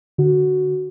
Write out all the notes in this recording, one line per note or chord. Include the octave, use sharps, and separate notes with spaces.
D3 F#4